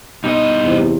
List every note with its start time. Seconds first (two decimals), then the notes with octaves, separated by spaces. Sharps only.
0.24 G2 B2 D#4 D#5
0.64 E2 C3